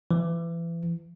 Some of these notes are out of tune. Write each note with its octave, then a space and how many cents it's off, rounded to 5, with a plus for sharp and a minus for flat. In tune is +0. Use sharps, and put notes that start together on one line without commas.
E3 +30